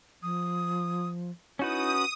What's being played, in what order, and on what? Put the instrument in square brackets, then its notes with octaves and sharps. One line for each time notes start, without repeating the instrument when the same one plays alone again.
[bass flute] F3 [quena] D#6
[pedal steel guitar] C#4 F#4 B4 [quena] D#4 [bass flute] E4 [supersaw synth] D#6